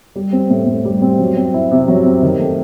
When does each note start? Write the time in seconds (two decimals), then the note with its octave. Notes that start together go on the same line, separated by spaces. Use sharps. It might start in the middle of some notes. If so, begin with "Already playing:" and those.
0.16 G3
0.33 C4
0.50 A2
0.67 A2
0.85 G3
1.02 C4
1.19 F#3
1.37 C4
1.54 E4
1.71 C3
1.88 F#3
2.05 C4
2.23 D#3
2.40 A3